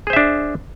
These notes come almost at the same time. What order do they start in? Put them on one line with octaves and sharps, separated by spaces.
G#4 C5 E5 D4